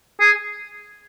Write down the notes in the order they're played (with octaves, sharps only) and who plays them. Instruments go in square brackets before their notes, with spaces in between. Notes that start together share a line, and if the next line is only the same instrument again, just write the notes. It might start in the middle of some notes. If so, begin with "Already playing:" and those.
[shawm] G#4